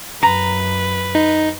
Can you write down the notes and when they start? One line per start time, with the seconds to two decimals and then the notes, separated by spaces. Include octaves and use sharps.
0.23 F#2 B4 A#5
1.15 D#4